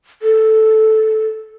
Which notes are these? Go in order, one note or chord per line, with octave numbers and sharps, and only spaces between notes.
A4